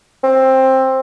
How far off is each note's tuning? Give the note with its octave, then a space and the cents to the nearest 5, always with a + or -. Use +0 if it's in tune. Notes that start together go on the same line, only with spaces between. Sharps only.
C4 +15